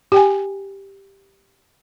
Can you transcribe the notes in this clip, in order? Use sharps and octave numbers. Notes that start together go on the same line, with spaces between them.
G4 G5 G#5